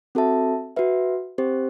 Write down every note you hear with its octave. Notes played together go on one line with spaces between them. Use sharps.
C4 F#4 A4 E5 A5
F#4 B4 E5
C4 G4 C5